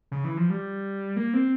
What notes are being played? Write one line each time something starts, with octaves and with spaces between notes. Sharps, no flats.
C#3
E3
F3
G3
A#3
C4